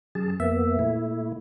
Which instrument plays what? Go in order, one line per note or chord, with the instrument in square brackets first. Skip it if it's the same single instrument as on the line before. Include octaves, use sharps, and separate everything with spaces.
[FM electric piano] F#2 [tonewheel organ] G#4 A5
[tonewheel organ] F2 A#3 B3 [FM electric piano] E5
[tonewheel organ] A#2 A3 E4